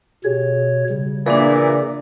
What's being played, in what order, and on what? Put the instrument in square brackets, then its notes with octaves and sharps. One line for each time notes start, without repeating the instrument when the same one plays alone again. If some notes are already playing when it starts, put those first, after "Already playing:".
[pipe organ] B2 C#5 [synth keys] G4 G#4
[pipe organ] C#3 [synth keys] G3
[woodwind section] A#2 E3 [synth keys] A#3 D5 [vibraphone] D4 G#4